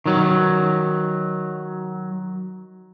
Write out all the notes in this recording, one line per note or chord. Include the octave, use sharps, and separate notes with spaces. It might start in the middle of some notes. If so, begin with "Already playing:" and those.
D#3 F#3